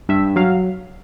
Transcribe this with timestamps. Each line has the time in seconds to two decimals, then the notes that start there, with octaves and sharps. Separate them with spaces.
0.09 G2 E5
0.36 F#3 F5